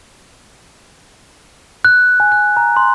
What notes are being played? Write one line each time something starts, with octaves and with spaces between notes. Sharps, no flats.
F#6
G#5
F#6
A#5
C6